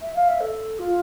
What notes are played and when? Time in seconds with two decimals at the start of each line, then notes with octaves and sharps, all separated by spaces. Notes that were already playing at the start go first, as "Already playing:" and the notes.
0.02 E5
0.15 F5
0.28 E5
0.40 A4
0.79 F4